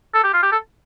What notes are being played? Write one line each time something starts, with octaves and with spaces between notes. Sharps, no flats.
A4
G4
F4
G4
A4